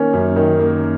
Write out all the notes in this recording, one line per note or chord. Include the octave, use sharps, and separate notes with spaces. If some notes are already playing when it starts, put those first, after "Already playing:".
Already playing: D#3 A#3 C#4
F#2
D#3
A#3